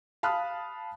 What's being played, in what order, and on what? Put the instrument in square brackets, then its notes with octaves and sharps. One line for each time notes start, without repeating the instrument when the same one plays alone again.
[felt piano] F5 A5 B5 D#6 F#6